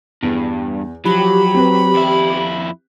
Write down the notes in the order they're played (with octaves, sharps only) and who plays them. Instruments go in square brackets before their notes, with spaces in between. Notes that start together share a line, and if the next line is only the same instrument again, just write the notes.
[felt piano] E2 [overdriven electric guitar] G2
[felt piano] F3 [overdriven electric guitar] F#3 [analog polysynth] G4 [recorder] B5
[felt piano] C4 B4
[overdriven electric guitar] F2 E4